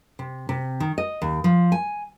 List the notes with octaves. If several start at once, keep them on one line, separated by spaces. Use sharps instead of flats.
C3
C3
D#3
D#5
D#2
F3
G#5